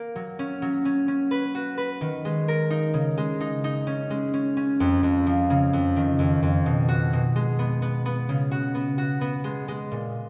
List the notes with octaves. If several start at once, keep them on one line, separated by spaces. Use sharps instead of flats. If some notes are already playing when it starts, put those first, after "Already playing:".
Already playing: A#3 A#4
F#3
C#4
F#3
C#4
C#4
B4
F#4
B4
D#3
G#3
A#4
D#4
C#3
G#3
D#4
D#4
C#4
G#3
C#4
C#4
F2
F2
F3
C#3
F2
D#3
F2
F2
B2
F#4
B2
G#3
B3
B3
B3
C#3
F#4
B3
F#4
B3
G#3
G#3
A#2